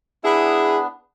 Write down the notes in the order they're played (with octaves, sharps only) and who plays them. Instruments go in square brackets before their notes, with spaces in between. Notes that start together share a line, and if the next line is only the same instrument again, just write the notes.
[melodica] B3 D4 [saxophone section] E4 G#4